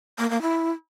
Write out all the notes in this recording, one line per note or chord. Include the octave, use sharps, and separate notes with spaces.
A#3
A#3
E4